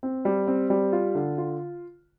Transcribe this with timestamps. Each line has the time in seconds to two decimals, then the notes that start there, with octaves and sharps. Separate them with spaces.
0.03 C4
0.25 G3
0.47 C4
0.70 G3
0.93 F4
1.15 D3
1.38 F4